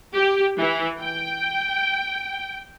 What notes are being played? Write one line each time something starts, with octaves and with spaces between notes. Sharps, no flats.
G4
E3
G5